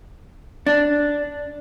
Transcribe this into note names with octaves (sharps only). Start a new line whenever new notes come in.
D4